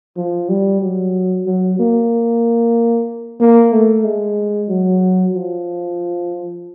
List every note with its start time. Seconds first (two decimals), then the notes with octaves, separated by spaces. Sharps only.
0.17 F3
0.49 G3
0.82 F#3
1.46 F#3
1.79 A#3
3.40 A#3
3.72 A3
4.04 G#3
4.69 F#3
5.35 F3